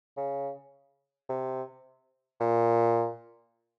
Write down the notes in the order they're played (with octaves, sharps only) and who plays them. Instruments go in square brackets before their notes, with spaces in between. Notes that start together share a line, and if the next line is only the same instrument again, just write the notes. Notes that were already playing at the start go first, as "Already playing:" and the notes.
[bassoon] C#3
C3
A#2